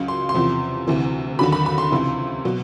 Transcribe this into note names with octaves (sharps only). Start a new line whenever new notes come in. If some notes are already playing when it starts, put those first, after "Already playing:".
Already playing: C#2 C#3 F#3
C6
C6
E2 C3 F3
D2 C3 E3
D#2 D3 F#3 B5
B5
B5
C6
C#2 C3 E3
B2 F#3